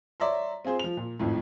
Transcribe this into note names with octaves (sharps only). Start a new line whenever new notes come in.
C#5 D5 E5 A#5 C6
C4 F4 G#4 C5
F3 F7
A#2
G#1 F2 A2